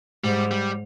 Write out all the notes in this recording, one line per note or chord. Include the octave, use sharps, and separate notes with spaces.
G#2 G3
G3